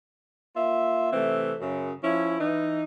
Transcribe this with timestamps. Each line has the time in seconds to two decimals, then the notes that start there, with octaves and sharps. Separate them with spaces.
0.57 A#3 F4 E5
1.13 C3 E3 A3 C4
1.61 F#2 C#3
2.04 F3 C#4 E4
2.40 E3 D#4